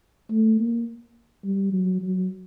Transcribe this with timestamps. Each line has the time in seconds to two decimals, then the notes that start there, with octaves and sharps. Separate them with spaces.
0.31 A3
0.60 A#3
1.44 G3
1.73 F#3
2.02 F#3